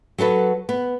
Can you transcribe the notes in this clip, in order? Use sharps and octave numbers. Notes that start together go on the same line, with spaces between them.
F#3 F#4 A4 B4
B3